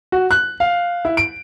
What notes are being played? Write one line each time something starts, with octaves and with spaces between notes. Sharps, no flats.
F#4
F#6
F5
E4
D7